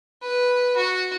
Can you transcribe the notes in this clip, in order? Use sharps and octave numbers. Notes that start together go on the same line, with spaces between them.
B4
F#4